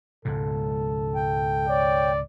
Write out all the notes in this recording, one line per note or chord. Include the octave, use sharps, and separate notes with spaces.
C#2 G#2 B2 A4
G5
C#5 D5